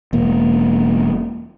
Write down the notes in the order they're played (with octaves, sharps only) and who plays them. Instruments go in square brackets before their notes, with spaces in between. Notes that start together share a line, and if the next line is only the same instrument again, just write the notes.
[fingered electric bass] E1 A#3